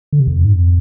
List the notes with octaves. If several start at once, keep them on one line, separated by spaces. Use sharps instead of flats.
D3
C3
E2
F2
G#2
F2